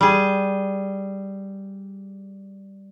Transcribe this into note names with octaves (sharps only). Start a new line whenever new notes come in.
G3 G#4